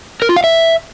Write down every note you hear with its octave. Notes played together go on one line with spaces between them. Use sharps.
A#4
F4
F5
E5